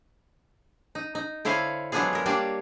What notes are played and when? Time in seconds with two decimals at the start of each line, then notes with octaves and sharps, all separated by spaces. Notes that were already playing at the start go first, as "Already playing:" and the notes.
0.95 D#4
1.15 D#4
1.45 D3 E4 C5 C#5 F5 G#5
1.92 F#3 G#3 B3 D4 F4 G#4
2.13 G#3 A#4
2.26 G3 A#3 D4 C#5 F5